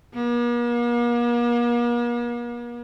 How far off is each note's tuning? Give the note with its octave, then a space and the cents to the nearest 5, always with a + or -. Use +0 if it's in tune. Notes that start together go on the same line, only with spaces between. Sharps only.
A#3 +45